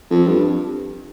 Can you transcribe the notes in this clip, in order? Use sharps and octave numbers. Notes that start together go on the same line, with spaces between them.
F2
G2